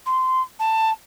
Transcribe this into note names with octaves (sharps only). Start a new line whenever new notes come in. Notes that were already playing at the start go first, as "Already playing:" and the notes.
C6
A5